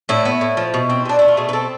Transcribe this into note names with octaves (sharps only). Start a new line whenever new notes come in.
A2 E4
B3
A2
F3
B2
C4
B2 D4
A3 E4
F4
B2 G#4
B4
C4 A4